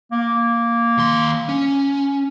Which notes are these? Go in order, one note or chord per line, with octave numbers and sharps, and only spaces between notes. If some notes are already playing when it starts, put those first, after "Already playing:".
A#3
D#2 C6
C#4